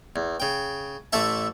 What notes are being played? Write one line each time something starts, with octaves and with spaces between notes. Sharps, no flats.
E2
C#3 G5
A1 A3 A4 E5 A5